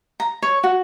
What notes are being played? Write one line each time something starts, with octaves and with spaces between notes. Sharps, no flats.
A#5
C#5
F#4